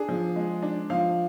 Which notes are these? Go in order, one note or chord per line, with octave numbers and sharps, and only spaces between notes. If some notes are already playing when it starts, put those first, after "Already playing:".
Already playing: D4 G#4
F3
G#3
D4
F3 F5